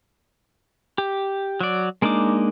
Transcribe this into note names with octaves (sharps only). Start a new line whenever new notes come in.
G4
F#3 D5
G#3 A#3 D4 D#4 D6